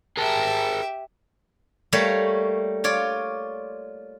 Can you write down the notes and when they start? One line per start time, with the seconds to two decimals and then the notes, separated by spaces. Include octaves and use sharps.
0.17 G4 G#4 A#4 E5 A5
1.93 G3 A3 A#3 C#5
2.84 F4 C#5 D5